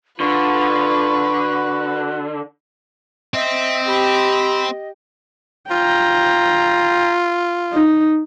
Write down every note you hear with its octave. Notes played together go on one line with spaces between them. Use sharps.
D3 F4 B4 C#6
F#4
C4 D#5 E5
G4 B5
F4 G5 A#5
D#4